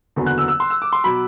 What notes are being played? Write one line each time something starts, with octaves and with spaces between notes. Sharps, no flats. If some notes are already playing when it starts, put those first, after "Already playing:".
F#1 E2 D3 F#3 B3
F#6
E6
E6
C6
E6
D6
C6
B2 F#3 B5